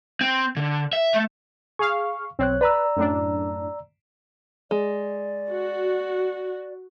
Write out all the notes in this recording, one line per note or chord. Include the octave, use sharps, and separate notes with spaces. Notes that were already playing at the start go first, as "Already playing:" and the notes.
C4
D3
E5
A3
G#4 F5 C#6
B1 C4 C#5 F#6
B4 D5 A#5 E6
F#2 A2 D4
G#3 D5
F#4